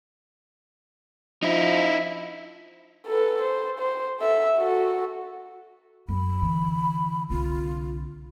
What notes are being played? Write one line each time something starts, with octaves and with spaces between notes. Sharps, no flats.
F3 D#4 E4
A4 B4
C5
C5
A4 E5
F#4 A4
F#2 B5
D3 E3
C2 D3 F4